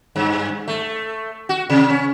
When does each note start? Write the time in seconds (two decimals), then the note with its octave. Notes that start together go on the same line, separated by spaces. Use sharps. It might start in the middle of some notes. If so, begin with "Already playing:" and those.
0.16 G2
0.68 A3
1.49 F#4
1.70 C3
1.90 C#4